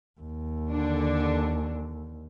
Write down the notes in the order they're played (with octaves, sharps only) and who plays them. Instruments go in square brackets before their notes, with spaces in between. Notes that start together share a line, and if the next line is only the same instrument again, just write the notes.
[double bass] D#2
[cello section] D3 D4